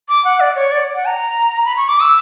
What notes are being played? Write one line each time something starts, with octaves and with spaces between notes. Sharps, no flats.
D6
F#5
D5
C#5
D5
F#5
A#5
B5
C#6
D6
E6